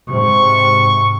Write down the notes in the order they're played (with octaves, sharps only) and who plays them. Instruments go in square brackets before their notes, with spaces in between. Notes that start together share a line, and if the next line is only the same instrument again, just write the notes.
[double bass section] G#2 C3 [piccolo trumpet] C#6